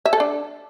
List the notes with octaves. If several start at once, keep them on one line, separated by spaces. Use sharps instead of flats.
E5
A4
D4